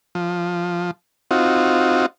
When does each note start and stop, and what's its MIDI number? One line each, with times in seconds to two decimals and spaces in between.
0.15 0.91 53
1.31 2.06 60
1.31 2.06 63
1.31 2.06 65
1.31 2.06 66